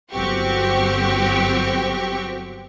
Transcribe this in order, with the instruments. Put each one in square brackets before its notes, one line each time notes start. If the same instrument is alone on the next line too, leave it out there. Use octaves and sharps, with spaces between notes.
[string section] G1 F#3 C4 F#4 G4 C#6